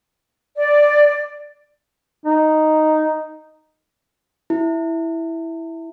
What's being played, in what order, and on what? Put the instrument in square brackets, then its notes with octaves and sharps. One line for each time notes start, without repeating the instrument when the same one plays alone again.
[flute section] D5
[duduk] D#4
[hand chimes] E4